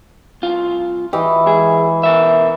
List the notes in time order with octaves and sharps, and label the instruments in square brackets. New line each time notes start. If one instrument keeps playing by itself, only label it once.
[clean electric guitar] C2 F4
[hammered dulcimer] E3 D#5 [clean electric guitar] G4
[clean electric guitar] G#2 G#4
B2 A#4 E5